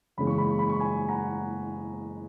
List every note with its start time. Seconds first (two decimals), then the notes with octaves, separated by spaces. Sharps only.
0.17 F#1 E2 C#3 G#3 B5
0.27 C#6
0.38 B5
0.48 C#6
0.59 B5
0.69 C#6
0.80 G#5 B5
1.08 F#5 A#5